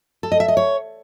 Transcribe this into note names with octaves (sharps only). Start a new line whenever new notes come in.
A4
D#5
E5
D#5
C#5